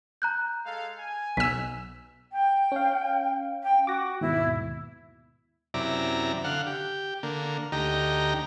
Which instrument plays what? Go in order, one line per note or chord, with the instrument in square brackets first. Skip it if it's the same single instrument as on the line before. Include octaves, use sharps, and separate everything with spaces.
[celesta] A#5 F#6 G6
[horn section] G#3 A4 F5
G#5
[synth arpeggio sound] B1 E6 [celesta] B6
[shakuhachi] G5
[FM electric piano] C#4 F5
[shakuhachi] G5
[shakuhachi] F#4 [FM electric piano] D6 A#6
[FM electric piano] D#2 G#2 B2 [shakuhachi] E4
[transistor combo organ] F#2 C3 E4 D5 A#5
D3 F5 F#5
G4
D3 A#3
D2 D#4 G4 A#5